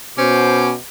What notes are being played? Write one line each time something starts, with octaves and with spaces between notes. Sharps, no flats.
B2 C#4 C5 D6